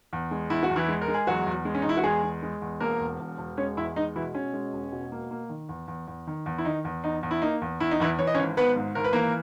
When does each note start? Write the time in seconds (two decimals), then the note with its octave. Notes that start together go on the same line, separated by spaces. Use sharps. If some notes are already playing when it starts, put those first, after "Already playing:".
0.13 E2
0.31 G#3
0.50 E2 E4
0.63 F#4
0.70 E2
0.76 E3 E4
0.88 G#3
1.02 A#4
1.08 G#3
1.14 G#4
1.27 E2 F#3 F#4
1.46 E2
1.65 G#3
1.75 C#4
1.82 D#4
1.85 E2 E4
1.97 F#4
2.03 E2 G#3 G#4
2.23 G#3
2.43 G#3
2.62 E2
2.80 E1 A#3 A#4
3.00 E2
3.20 E1
3.38 E1
3.57 G#3 C#4 C#5
3.77 E2 E4 E5
3.96 G#3 D#4 D#5
4.15 B2 E3 E4
4.34 B2 C#4
4.53 G#3
4.73 E1
4.92 B2
5.12 A#3
5.31 A#3
5.50 D#3
5.69 E2
5.88 E2
6.08 E2
6.27 D#3
6.46 E2
6.58 E4
6.65 D#3 D#4
6.85 E2
7.04 E2 D#4
7.23 E2
7.31 E4
7.42 A#3 D#4
7.61 E2
7.80 E2 E4
7.91 D#4
8.00 E2 E3 E4
8.19 E3 C#5
8.27 D#5
8.34 C#4 C#5
8.38 G#1
8.57 G#1 B3 B4
8.76 G#2
8.95 G#1 A#4
9.04 B4
9.13 E3 A#3 A#4